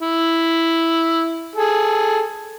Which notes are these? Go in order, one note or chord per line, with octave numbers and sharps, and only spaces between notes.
E4
G#4 A4